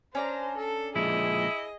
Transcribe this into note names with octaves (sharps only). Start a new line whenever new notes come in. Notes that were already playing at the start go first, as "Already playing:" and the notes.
C#4 D4 C5 A#5
A4
A#2 F3 G#3 E4 G#4 D#5